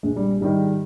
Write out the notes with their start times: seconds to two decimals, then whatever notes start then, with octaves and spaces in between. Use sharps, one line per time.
0.03 A#1 G#3
0.16 G3
0.41 G#2 D#3 G3